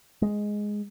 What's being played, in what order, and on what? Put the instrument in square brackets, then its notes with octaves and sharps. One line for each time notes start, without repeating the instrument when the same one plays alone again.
[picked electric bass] G#3